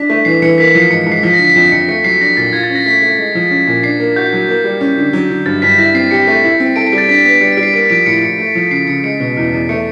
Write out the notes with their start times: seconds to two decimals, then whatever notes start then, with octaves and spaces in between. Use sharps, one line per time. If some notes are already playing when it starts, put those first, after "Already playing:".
Already playing: D4 B6
0.10 A3
0.25 E3 C7
0.42 E3 C#7
0.58 A#3 B6
0.69 B6
0.75 F3
0.80 C7
0.90 G#2 C#7
1.01 G#2 C#7
1.12 C7
1.23 F3 B6
1.34 A#6
1.39 D3
1.45 B6
1.56 F2 B6
1.72 F2 C#7
1.88 A3 C#7
2.04 F#3 C7
2.21 D4 A#6
2.37 A#2 A6
2.53 F4 G#6
2.64 A6
2.70 C#4
2.76 A#6
2.86 A3 B6
3.02 A3
3.18 G#3
3.35 F3
3.51 C#4
3.67 A#2
3.83 D4 C7
4.00 A#3
4.16 F#4 G6
4.33 F#3
4.48 A#3
4.64 G3
4.81 C#4
4.98 D3
5.13 F#3
5.30 D3
5.46 G2 A6
5.62 G2 B6
5.78 E4 A#6
5.95 C4 C7
6.11 G4 C#7
6.27 A3
6.44 E4
6.60 C4
6.76 A4 D7
6.86 D7
6.92 G3
6.98 A6
7.08 D4 B6
7.25 B3 B6
7.41 G3 C#7
7.52 G3 D7
7.63 C7
7.74 A#3 D7
7.90 F3 D7
8.06 A2 C#7
8.22 A2 C#7
8.39 A3
8.55 F3
8.71 C#3 C7
8.87 C#3 C#7
9.04 G#3 C#7
9.20 B2
9.37 E2
9.53 E2
9.69 A3 C#7